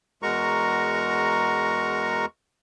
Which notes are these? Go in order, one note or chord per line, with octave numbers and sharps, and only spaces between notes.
E2 G#3 F#4 A#4 A#5 C#6